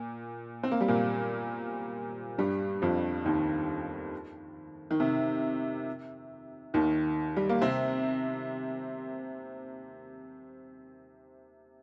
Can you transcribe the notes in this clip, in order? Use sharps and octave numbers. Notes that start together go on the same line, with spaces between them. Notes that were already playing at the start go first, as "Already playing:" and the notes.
Already playing: A#2
C4
A#3
G3
A#2 A#3
G2 G3
F2 F3
D#2 D#3
D#3
C3
D#2 D#3
G3
A#3
C3 C4